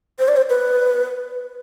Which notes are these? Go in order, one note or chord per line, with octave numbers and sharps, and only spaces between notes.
C5
D5
C5
B4